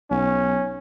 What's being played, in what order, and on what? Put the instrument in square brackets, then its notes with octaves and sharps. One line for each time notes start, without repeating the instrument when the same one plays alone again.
[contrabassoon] B1 [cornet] C#4